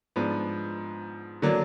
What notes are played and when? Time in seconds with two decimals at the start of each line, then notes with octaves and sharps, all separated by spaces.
0.16 G#2 F3 B3 D4
1.42 D3 F#3 A#3 D4